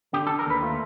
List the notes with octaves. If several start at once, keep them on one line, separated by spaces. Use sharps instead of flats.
D3 G4
A4
D3
A#4
D#2 B4
A3 F4